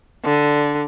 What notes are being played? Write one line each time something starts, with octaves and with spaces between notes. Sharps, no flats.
D3